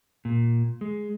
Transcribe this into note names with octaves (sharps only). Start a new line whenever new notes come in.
A#2
G#3